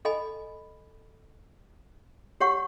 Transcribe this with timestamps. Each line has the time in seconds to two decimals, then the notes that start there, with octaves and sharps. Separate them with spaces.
0.05 A4 D#5 G#5 B5
2.40 G4 C#5 F#5 C#6